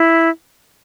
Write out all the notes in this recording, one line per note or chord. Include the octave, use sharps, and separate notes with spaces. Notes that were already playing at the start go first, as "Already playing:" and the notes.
Already playing: E4